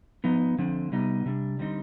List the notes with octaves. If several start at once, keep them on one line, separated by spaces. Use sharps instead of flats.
F3 B3 D#4
D3 F3 C4
C3 G3 B3 D#4
C3 G3 D4
D3 G3 C4 D#4